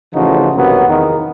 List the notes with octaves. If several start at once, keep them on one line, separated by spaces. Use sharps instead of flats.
A1 C#3 E3 F3 D#4 F#4
B1 F#2 C3 F#3 A#3 B3
E2 D#3